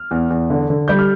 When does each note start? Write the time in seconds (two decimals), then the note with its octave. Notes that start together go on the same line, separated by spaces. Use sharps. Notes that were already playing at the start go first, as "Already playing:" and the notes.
Already playing: F6
0.11 E2
0.30 E2
0.50 D3
0.70 D3
0.88 G3 G6
0.99 F6